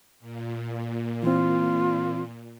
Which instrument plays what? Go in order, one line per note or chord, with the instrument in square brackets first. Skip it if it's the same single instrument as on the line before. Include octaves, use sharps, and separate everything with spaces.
[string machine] A#2
[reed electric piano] E3 C4 [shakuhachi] F4